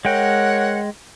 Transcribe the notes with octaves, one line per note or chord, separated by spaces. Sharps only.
G#3 A#4 C#5 F#5 G5